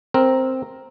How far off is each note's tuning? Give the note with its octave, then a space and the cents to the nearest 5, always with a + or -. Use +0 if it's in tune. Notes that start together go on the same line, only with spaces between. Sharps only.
C4 +0 A#4 +0